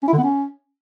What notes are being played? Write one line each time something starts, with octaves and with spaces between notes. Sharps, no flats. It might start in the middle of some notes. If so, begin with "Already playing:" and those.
C#4
E4
D3
B3
C#4